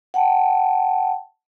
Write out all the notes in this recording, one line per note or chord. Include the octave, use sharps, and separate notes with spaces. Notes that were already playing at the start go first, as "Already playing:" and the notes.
F#5 G5 A5